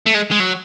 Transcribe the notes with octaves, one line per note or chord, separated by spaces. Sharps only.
A3
G#3
G#3
F#3